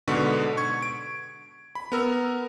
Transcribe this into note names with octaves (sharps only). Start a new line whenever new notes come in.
G#2 B2 D3 B3 C#6 B6
C#6 G#6
D7
B5
B3 A#4 E6